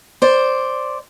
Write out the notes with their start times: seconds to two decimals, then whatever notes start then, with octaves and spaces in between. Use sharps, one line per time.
0.22 C5 D5